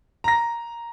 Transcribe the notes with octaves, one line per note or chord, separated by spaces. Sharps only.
A#5 A#6